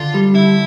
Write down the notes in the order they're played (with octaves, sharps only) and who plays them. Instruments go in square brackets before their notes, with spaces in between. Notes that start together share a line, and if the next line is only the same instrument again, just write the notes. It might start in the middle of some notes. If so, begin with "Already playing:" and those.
Already playing: [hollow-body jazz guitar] D3 [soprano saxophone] F4
[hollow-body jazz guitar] G3
[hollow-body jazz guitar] D3 [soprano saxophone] E4